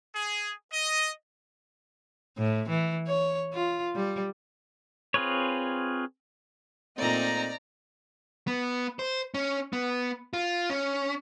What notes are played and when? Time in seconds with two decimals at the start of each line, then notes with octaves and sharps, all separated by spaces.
0.13 G#4
0.72 D#5
2.38 A2
2.69 E3
3.07 C#5
3.53 F4
3.95 G3
5.14 C4 F4 G#4 B4 C#5
6.98 A#2 A3 C4 D#4 D5 A#5
8.47 B3
8.99 C5
9.34 C#4
9.73 B3
10.33 F4
10.70 C#4